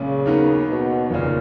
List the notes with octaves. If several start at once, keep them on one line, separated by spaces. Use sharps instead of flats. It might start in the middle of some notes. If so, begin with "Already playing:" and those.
Already playing: B1 A#2 C#3 G#3
D#2 D#3 F#3 B3
B2
F1 D#2 A#2 C#3